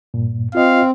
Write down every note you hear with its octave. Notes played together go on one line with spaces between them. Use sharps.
G2 A#2
C4 F4 D#5 F5